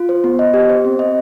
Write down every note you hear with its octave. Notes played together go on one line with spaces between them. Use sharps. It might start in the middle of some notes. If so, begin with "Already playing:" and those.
Already playing: F4
C5
B3
D#5
G4
C5
C4
D#5